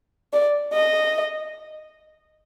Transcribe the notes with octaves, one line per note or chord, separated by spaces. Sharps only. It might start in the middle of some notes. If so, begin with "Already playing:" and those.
D5
D#5